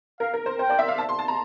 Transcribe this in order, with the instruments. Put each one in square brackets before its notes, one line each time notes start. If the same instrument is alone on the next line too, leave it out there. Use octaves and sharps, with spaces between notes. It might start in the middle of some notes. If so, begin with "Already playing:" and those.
[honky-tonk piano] A#4 [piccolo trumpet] F5
[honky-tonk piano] A#4
C5
[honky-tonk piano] C5 [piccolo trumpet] G5
[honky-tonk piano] D5
E5
F5
A5
C6
A5
A#5